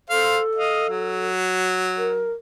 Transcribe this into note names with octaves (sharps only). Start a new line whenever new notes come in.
A4 C5 F5
D#5 F5
F#3
A#4